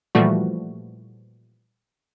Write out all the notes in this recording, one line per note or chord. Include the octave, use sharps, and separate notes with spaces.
A#2 E3 F3 G3 A3 F#4